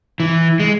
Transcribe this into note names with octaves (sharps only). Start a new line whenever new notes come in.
E3
G#3